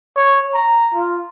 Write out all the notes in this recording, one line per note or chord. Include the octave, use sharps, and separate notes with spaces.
C#5
A#5
F4